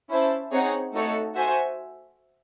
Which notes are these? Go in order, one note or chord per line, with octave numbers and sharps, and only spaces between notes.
C#4 E4 C5 E5 A5
C4 D#4 G#4 C#5 F#5
A3 D#4 F#4 A4 C#5
F#4 C5 E5 G#5